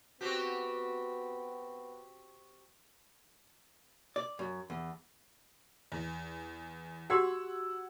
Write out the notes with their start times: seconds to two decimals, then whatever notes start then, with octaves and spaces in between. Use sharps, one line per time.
0.21 B3 C4 F#4 G4
4.16 D5
4.39 F#2
4.70 E2
5.92 E2
7.10 F#4 G4 F#5 C6 E6 G#6